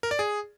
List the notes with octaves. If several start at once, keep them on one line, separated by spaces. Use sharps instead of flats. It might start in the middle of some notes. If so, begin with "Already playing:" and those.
A#4
D5
G#4